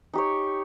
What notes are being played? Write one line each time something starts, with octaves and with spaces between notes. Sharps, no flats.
D#4 G4 C#5